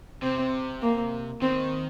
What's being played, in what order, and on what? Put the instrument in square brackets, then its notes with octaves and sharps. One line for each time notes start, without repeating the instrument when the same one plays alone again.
[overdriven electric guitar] C3 [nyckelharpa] C4
[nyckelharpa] A#3
[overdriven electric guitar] D#3 [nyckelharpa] C4